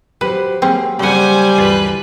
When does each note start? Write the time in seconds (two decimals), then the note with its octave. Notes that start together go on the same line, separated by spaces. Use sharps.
0.21 F#3 G4 B4 C5
0.62 F#3 A#3 C4 C#4 G#4
0.99 C#3 G3 C5 F#5 G#5
1.58 D2 G2 E3 F4 B4